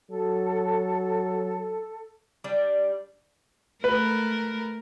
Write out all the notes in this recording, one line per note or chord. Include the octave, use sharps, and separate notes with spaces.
F#3 A4
G3 D4
A3 A#4 B4